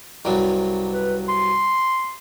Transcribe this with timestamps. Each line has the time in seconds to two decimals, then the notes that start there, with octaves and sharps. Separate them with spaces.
0.25 C2 G2 F#3
0.92 B4
1.28 C6